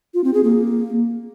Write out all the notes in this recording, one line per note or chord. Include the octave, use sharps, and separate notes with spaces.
F4
C4
G#4
A#3